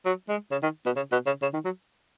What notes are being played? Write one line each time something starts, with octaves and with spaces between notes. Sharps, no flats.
F#3
G#3
C#3
D#3
B2
C#3
B2
C#3
C#3
D#3
F#3